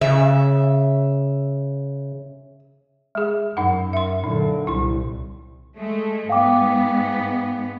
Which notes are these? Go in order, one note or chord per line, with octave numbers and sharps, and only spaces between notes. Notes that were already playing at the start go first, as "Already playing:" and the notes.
C#3 E5
G#3 G#4
F#2 D#4 F#5
E5 C6
A#2 D3 F#3 D#4
C2 E4 C6
G#3 A3
G#2 B3 F5 G5 D6